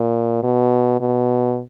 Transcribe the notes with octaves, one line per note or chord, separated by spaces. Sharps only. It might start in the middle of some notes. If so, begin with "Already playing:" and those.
Already playing: A#2
B2
B2